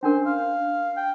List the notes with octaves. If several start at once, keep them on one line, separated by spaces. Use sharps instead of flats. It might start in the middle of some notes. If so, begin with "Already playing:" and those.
C#4 D4 A#4 C5
F5
G5